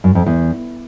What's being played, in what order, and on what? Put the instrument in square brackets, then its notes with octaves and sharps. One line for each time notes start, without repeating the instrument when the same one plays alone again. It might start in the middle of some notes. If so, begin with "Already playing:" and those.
[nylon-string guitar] F#2
F2
E2